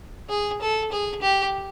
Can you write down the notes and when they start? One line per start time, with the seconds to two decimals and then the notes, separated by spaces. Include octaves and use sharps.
0.30 G#4
0.61 A4
0.92 G#4
1.22 G4